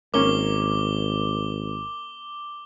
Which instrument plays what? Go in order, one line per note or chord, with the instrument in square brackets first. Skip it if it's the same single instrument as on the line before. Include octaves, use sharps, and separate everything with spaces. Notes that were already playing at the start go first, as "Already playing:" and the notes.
[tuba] G#1 [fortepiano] A#3 C#4 [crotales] D6 G7